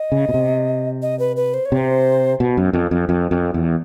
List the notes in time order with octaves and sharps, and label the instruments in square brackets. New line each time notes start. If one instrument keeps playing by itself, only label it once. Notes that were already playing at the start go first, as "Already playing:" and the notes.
Already playing: [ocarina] D#5
[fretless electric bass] C#3
B2
C3
[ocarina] D#5
B4
B4
C5
C#5
[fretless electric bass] C3
[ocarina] C5
[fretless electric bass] B2
F#2
F2
F2
F2
F2
E2